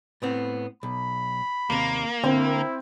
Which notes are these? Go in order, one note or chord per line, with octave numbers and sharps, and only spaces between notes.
A2 B3 C4
B1 B5
D#2 C3 A#3
D3 C4 E4